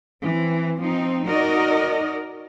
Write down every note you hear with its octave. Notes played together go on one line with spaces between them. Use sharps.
E3 C4
F3 C4 D#4
D#4 F#4 A#4 D5 D#5